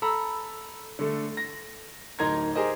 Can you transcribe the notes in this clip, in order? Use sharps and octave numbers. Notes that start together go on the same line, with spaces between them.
A4 A#5 B5 E6
D3 A3
A#6
D1 D#4 A#4 A#5 C6 G#6
G4 G#4 A#4 C5 D#5